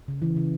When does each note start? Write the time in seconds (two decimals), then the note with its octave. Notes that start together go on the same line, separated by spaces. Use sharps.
0.08 C#3
0.22 E3
0.37 C#3